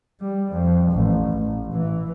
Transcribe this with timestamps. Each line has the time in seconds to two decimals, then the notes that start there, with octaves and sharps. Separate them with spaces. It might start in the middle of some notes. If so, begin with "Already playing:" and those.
0.21 G3
0.52 F2
0.92 A1
1.38 A1
1.74 E3